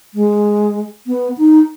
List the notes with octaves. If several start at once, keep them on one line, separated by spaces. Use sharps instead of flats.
G#3
B3
D#4